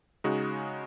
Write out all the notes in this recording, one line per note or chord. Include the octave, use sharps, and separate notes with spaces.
C#3 G#3 D#4 F#4